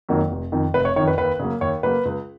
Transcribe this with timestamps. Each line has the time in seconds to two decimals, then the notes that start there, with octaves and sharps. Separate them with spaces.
0.09 F2 D#3 F#3 A#3
0.31 F1
0.52 F2 D#3
0.74 F1 B4
0.85 C#5
0.96 D#3 C#5
1.00 F2
1.08 B4
1.18 D#2 B4
1.40 C#3 F#3 A#3
1.61 D#2 C#5
1.83 C#3 F#3 A#3 B4
2.05 C#2